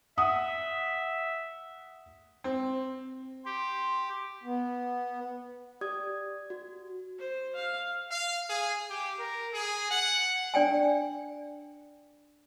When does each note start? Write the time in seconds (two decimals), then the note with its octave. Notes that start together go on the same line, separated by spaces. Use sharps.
0.18 E5 F#5 D#6
2.44 C4
3.45 G4 C6
4.43 B3
5.81 G4 D5 D#6 G#6
6.50 F#4
7.19 C5
7.55 F5
8.11 F5
8.49 G#4
8.90 G4
9.19 A#4
9.53 G#4
9.91 F#5
10.54 D4 D5 G5 G#5